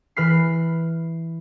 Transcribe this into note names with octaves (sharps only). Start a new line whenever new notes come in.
E3 B4 F6 B6 C7